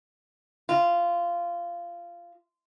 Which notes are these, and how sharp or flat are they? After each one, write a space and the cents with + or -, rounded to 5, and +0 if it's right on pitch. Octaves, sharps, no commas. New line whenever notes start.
F4 -15